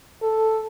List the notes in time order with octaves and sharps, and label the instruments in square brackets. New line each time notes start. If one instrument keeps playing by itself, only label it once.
[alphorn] A4